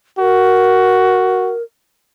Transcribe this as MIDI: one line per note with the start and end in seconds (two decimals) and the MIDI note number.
0.19 1.54 66
0.19 1.63 70